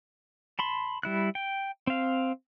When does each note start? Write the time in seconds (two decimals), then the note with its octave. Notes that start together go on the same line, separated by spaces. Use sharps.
0.59 A5 B5 C6
1.03 G3 E4 F#6
1.35 G5
1.87 C4 F5